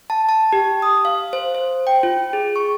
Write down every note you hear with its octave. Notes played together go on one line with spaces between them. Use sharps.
A5
A5
G4
D#6
F5
C5
C5
G5
F4
G#4
C#6